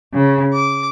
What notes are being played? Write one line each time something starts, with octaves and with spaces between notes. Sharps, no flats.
C#3
D6